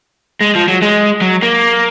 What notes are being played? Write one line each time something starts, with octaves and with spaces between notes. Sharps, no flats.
G#3
F3
F#3
G#3
F#3
A#3